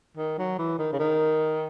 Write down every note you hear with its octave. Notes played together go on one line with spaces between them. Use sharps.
D#3
F#3
E3
D#3
C#3
D#3